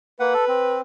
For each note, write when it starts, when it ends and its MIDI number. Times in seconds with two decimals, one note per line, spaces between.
0.20 0.34 58
0.20 0.77 71
0.20 0.34 78
0.34 0.45 69
0.48 0.81 60